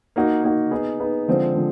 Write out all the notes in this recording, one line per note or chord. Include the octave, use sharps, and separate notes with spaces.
A#3 D#4 F#4
A#3 D#4 F#4
B3 D#4 G#4
B3 D#4 G#4
D3 F3 G#3 C4 F4
D3 F3 G#3